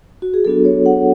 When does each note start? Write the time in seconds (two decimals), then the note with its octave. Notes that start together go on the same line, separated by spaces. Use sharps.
0.22 F#4
0.34 G#4
0.45 F#3 B3 D4 F#4 A4
0.65 C#5
0.86 F#5